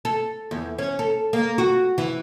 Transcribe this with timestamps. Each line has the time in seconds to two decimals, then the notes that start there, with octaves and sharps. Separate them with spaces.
0.05 A4
0.51 E2
0.78 C#4
0.99 A4
1.33 A#3
1.58 F#4
1.98 E3